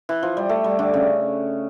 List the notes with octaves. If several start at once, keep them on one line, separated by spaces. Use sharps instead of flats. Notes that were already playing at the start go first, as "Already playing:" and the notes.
E3
F3
G3
A3
G3
D3
C#3